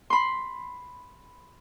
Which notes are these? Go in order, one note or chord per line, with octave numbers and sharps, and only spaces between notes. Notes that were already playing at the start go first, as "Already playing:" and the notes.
B5 C6